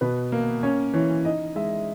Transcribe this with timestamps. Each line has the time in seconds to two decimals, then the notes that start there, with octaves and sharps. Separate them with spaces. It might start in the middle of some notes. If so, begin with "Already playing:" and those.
0.01 B2 B4
0.32 A#3
0.63 C#4 C#5
0.93 E3 C#5
1.25 D#4 D#5
1.56 G#3 E5